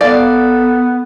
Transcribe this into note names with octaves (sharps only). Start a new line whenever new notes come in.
B3 A4 D5 F5